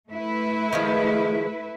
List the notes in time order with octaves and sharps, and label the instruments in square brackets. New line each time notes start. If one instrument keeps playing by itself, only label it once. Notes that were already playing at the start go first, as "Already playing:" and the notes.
[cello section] A3 E4 B4
[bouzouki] D#3 F3 G#3